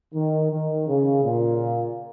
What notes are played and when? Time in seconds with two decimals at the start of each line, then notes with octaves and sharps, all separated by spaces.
0.14 D#3
0.51 D#3
0.88 C#3
1.24 A#2